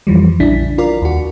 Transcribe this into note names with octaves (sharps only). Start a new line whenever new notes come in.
F2 E3 F3 G3
A#1 C#3 D4 E4 B6
F4 A#4 D5
D#2 F#4